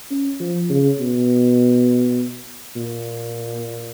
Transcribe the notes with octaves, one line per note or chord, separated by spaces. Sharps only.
C#4
F3
C#3
B2
A#2